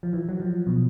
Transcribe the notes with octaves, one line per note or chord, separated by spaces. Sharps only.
F3
E3
F#3
F3
B2